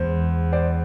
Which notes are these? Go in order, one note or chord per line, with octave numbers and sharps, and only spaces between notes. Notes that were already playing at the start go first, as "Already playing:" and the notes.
Already playing: E2 G#3 C5
C5 D5